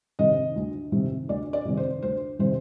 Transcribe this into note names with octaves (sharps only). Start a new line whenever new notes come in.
C3 D#3 D#5
D2
C3 D#3
D2 D5
D5
C3 D#3
C5
D2 C5
C3 D#3 C5